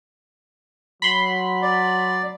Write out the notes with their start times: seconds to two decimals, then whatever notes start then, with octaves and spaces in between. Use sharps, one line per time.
1.02 F#3 B5 C6
1.62 D5